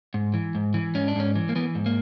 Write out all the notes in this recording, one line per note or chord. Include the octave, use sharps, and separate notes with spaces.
G#2
E3
G#2
E3
G#2 C#4
D4
G#2 C#4
E3
A#3
E3 B3
G#2
A#3